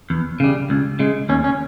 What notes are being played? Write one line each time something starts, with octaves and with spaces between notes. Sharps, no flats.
E2
C#3 G3
C#2
C#3 G#3
D#2 C#4
C#4